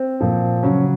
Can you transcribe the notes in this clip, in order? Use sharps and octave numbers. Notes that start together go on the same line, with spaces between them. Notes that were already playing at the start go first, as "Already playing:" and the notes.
Already playing: C4
A#2 F3
C#3 F#3 C#4